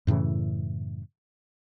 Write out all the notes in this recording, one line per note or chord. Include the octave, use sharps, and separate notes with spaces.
F#2 A2 C#3 E3